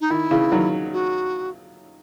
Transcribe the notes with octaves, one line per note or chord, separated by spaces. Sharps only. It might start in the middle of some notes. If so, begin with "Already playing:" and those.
D#4
D#3 E4
C#3 E3
D#3 F#3
F#4